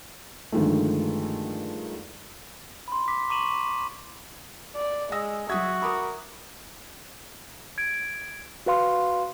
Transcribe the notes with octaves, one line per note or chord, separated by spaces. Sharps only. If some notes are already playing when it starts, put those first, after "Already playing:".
G2 D3 D#3 F3 G#3 A3
B5 C6
D6 B6
A#5 C#6 D6 D#7 E7 F#7
D5
G#3 D#6 E6 A#6
F#3 F#4 E5 D#6 G#6
A#4 B5 D6 D#6
G#6 D7
F#4 B4 F5 C6